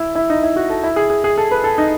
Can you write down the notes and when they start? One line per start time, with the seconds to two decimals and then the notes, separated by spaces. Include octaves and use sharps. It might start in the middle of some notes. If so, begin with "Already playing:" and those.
Already playing: E4
0.15 E4
0.30 D#4
0.43 E4
0.56 F#4
0.70 A4
0.83 E4
0.96 G#4
1.10 G#4
1.24 G#4
1.38 A4
1.51 B4
1.64 A4
1.78 D#4